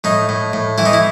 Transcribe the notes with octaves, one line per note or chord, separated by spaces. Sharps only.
A2 D#4
A2
A2
E3 E4
D#4
E4